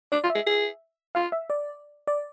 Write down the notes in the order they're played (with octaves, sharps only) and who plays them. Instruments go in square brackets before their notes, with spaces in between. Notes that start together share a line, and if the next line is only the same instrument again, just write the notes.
[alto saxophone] D4 [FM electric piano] D5
[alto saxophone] F4
[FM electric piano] E5
[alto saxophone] G#4
G#4
[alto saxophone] F4 [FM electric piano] F5
[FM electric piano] E5
D5
D5